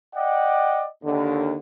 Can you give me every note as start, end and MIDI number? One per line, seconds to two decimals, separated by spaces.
0.15 0.85 74
0.15 0.85 75
0.15 0.85 78
0.15 0.85 79
1.02 1.57 39
1.02 1.57 50